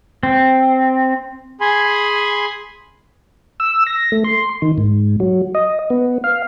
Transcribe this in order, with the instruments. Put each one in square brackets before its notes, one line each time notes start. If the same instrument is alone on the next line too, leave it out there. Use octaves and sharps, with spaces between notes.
[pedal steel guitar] C4
[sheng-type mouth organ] G#4 G#5 B5 C6
[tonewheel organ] E6
A#6
A3
C6
D#3
G#2
F#3
D#5
B3
F5